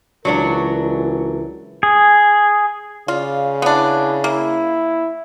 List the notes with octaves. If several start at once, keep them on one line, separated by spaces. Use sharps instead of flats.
C#2 E3 F#3 D4 F#4 A#4
G#4
C#3 F4 D5
B3 D4 E4
A#3 E4